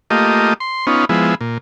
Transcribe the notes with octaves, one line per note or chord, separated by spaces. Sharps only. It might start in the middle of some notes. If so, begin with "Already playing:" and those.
A3 A#3 F4 G4 D#5
C6
B3 C#4 D#4 F4
F3 G#3 B3 E4
A#2